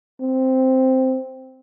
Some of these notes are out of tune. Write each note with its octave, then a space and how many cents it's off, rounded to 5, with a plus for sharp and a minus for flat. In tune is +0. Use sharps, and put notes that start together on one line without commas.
C4 -5